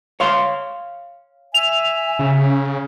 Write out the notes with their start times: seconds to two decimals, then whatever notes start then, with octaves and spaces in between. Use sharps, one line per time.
0.20 C#5 F5 C6
1.54 E5 G#5 F7
2.19 C#3